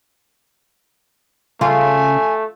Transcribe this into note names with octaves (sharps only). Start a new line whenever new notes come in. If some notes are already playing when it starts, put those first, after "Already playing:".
C#3 A3 F4 G#5